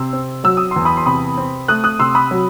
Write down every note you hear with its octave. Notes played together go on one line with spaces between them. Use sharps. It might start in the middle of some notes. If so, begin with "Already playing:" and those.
Already playing: C3 C6 E6
C4
F#3 E6
D#6
E2 C6
B5 D#6
C6
C3 B5 D#6
C4
A3 D#6 F#6
D#6 F#6
C3 C6 E6
B5 D#6
F#3